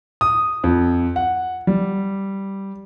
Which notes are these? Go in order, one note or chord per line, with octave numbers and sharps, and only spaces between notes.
D#6
F2
F#5
G3